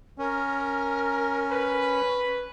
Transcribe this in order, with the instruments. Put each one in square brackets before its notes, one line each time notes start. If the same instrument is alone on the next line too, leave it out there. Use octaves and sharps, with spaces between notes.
[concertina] C#4 [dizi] A#4
[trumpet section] B4